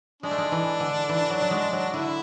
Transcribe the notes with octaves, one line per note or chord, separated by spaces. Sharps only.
G#3 D4
A3
G#3
E3
D3
E3
F#3
F#3
G#3
F#3
D3 E4